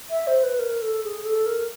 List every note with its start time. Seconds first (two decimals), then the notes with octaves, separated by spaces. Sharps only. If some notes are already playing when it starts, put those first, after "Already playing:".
0.10 E5
0.27 C5
0.43 B4
0.59 A#4
0.82 A4
1.04 G#4
1.25 A4
1.46 A#4